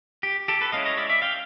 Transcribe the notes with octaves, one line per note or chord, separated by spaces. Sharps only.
G4
G4 A4
A4 B4
G#3 C#4 E4 D#5 F5
C#5 D#5
D5 E5
D5 E5
F5 G5